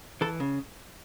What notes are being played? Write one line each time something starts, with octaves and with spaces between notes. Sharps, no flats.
E3 A4
C#3